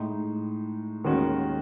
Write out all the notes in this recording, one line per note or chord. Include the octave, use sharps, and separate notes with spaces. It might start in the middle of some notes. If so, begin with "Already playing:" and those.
Already playing: A2 G#3 D#4
D#2 D#3 G#3 C#4 F#4